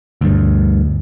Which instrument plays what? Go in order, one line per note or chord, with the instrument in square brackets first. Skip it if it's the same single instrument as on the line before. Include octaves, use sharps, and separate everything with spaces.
[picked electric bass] D2 G2